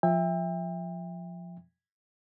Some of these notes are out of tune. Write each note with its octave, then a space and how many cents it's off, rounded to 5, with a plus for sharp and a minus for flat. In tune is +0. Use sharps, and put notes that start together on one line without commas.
F3 +0 E5 +0 G5 +35